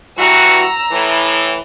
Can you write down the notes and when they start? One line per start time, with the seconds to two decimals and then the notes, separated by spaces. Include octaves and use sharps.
0.18 G2 E3 F#4 A#5 E6
0.91 A2 E3